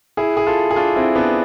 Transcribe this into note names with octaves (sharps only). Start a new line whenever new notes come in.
E4 G#4
G#4
F4 A4
G#4
D4 F4
C4 E4
B3 D4